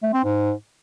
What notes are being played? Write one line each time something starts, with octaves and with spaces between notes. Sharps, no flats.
A3
C4
G#2